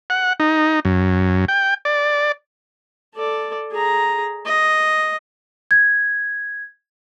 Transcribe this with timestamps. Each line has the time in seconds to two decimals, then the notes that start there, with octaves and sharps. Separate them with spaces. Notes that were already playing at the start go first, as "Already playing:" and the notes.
0.10 F#5
0.40 D#4
0.85 F#2
1.48 G5
1.85 D5
3.15 A4 D5
3.72 G#4 A#5
4.46 D#5
5.71 G#6